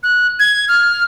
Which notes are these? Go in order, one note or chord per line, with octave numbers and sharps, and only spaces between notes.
F#6
G#6
F6